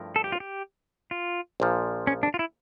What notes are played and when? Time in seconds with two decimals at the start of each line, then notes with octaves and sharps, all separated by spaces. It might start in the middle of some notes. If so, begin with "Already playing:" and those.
Already playing: G2 F3 A3 E4 A#4
0.16 A4
0.24 G4
0.32 F4
0.40 G4
1.11 F4
1.60 A#1 A#2 F3
2.07 C#4
2.23 D4
2.34 F4
2.39 E4